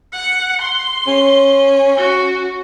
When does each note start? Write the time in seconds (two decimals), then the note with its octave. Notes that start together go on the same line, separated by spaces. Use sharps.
0.12 F#5
0.61 C6
1.07 C#4
1.97 F#4